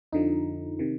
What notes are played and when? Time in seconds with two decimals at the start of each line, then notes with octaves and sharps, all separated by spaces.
0.13 F2 D3 F3 D#4
0.79 C3 D#3